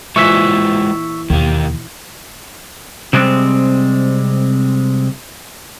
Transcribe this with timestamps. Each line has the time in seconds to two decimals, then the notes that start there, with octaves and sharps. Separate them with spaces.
0.16 A#2 E3 G#3 F4 C5 C#6 E6 B6
1.30 D#2 B2 D#3 G4
3.13 C3 G3 G#3 C4